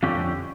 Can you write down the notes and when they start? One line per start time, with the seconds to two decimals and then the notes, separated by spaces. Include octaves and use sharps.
0.03 F2 D3 F3 C#4 G4